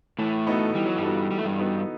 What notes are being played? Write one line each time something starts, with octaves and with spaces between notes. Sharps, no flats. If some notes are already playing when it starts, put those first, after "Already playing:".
A2 E3 A3
B3 D#4 F#4 A4
E3 G3
F#3
G2 G3
B3 D#4 F#4 A4
E3 G3
A3
G2 G3
B3 D#4 F#4 A4